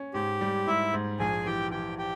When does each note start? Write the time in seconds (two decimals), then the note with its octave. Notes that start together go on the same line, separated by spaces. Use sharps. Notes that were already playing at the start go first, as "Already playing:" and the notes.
Already playing: C#4
0.14 G#2 G4
0.41 G3
0.67 G#2 E4 E5
0.94 G#2
1.20 A#1 G#4 G#5
1.46 E3 G4 G5
1.71 E3 G4 G5
1.98 G4 G5